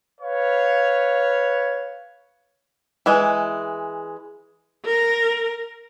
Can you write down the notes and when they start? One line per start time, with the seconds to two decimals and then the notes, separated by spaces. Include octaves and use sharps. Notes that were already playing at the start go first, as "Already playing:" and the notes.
0.21 B4 C#5 F5
3.06 E3 G#3
4.85 A#4